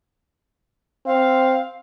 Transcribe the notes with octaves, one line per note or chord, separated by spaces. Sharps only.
C4 F5